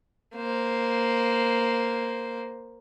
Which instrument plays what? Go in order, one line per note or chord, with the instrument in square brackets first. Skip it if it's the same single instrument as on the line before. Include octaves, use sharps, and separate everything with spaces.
[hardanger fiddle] A#3 C5